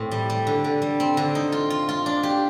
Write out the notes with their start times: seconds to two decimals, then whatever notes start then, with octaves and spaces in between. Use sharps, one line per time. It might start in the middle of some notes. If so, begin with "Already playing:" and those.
Already playing: A2 C4
0.11 G3
0.30 G3
0.47 D3
0.64 D3
0.82 G3
1.00 C4
1.17 D3
1.35 D#4
1.52 F4
1.70 F4
1.89 F4
2.06 D4
2.23 G4